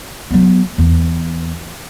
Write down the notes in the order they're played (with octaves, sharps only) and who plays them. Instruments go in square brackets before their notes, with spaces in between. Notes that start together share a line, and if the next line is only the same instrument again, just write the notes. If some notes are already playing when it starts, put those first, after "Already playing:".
[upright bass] F#3 B3
E2